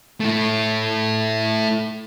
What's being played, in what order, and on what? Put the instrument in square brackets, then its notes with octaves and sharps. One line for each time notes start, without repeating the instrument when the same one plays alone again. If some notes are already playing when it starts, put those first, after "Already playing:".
[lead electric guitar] A3 E4